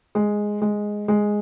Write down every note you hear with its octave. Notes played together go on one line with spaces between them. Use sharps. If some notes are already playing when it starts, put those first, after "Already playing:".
G#3
G#3
G#3